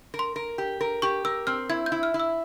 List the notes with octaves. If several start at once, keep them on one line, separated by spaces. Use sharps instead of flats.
A#4
C6
A#4
G4
A#4
G4 C#6
A#4 E6
C4 F6
E4 G#6
G6
E4
F6
E4
E6